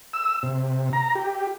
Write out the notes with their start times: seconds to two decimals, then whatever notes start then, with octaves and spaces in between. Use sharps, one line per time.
0.13 E6
0.43 C3
0.93 A#5
1.15 G4